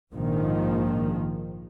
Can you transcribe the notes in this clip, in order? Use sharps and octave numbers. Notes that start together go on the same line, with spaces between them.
A#1 G#2 D#3 F3